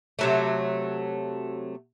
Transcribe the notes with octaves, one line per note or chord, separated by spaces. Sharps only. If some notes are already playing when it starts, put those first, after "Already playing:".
C3 F#3 A3